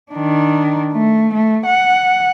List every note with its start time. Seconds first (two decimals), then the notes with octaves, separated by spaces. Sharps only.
0.12 D#3 D4
0.92 A3
1.34 A3
1.66 F#5